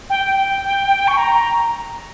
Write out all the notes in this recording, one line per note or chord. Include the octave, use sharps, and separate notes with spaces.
G5
G5
C#6
A#5